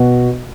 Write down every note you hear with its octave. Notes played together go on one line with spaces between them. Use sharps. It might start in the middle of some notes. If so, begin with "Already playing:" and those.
Already playing: B2 F#4